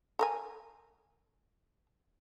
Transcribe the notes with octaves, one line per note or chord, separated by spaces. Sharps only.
A4 A#4 G#5